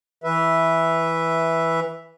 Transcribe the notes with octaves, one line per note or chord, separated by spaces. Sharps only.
E3 B4 E5